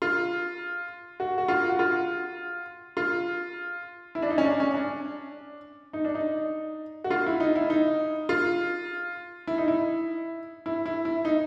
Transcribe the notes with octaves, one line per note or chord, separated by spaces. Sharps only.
F4
F#4
F#4
F4
F#4
F4
F4
E4
D4
D#4
C#4
D4
C#4
D4
D#4
D4
D#4
F#4
F4
E4
D#4
E4
D#4
F4
E4
D#4
E4
E4
E4
E4
D#4